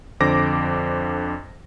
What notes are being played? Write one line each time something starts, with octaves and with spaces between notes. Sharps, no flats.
F2 D3 C5 D6 A#6